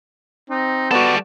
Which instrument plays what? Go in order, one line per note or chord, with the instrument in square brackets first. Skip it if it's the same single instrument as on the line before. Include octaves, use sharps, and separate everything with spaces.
[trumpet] C4 [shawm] D#4
[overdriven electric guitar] G3 A4 [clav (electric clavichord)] B3 F#4 [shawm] D5